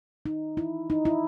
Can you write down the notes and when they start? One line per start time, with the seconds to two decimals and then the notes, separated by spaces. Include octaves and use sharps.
0.26 D#4
0.57 E4
0.90 D#4
1.05 E4